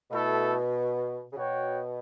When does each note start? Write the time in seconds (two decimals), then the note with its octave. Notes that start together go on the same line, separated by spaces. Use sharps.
0.11 B2 A3 E4 A4
1.32 C#3
1.36 B2 F#4 C#5 G5